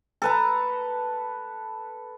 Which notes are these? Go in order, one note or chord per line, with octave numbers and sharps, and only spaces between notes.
A4 B4 A#5